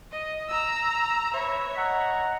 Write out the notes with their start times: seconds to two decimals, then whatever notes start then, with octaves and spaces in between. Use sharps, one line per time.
0.12 D#5
0.48 A#5 E6
1.34 B4 C#5 E5
1.76 D#5 F#5 A#5